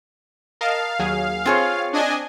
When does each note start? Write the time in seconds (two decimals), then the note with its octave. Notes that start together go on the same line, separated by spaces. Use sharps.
0.61 A#4 D#5 F5 A5
0.99 D#2 F#3 G#4
1.46 C4 F4 G#4 C#5
1.93 D4 D#5 G#5